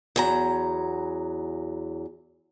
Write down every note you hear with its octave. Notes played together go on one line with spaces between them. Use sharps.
E2 F#3 A#5